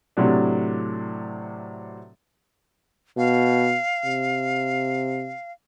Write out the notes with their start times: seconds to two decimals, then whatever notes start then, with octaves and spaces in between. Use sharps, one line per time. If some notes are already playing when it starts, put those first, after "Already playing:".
0.17 A2 C3 F#3 D4
3.18 B2 F5
4.05 C3